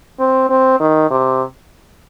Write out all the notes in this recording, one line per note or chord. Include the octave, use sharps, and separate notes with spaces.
C4
C4
D#3
C3